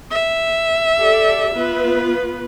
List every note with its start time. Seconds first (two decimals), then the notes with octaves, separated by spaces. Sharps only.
0.10 E5
0.98 G4 A4 D5
1.55 B3 F4 B4